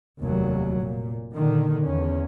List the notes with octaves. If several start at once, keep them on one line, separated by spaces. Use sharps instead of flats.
F1 D#2 F#3 G3
A#2
A#2 D3 D#3
E2 C#4